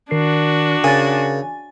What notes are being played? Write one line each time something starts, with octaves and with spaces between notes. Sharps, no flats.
D#3 D4 F#4 A#4 C7
C#3 A#4 G#5 A6